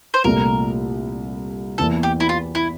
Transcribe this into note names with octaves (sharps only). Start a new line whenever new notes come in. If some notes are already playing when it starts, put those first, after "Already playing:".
C5
C2 A#2 A3 A#4
E2 E3 A#3 A4
G4
E4
F4
E4